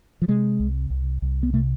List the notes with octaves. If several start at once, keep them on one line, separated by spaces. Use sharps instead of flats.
F3
C3 G#3
C2
C2
C2
B3
C3 A3